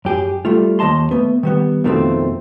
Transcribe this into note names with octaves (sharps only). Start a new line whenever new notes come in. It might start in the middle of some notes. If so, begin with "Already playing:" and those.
F#2 G4 G#4
G3 A3 F4
D#2 C4 D#5 A5 C6
A3 B3
D#3 G3 B3
F2 B2 D#3 F3 A3 C4